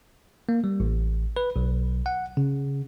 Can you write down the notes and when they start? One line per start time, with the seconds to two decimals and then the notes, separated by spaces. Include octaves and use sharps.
0.49 A#3
0.64 G3
0.80 A1
1.37 B4
1.56 B1
2.06 F#5
2.37 C#3